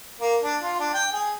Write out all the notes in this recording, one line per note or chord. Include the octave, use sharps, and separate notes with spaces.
A#3
D4
F4
D4
G5
G#4